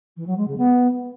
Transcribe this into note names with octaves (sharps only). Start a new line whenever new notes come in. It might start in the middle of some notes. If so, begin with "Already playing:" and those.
E3
F#3
G#3
C#3
B3